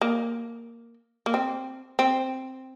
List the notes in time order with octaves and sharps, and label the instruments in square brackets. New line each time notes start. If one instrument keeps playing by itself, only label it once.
[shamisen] A#3
A#3
C4
C4